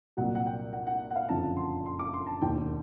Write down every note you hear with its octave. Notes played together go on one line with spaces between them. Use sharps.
C2 A#2 F#3 F#5
F#5
G5
F#5
F#5
F#5
F5
F#1 F2 D3 F3 A5
C6
C6
D6
C6
A5
E1 D#2 D#3 G5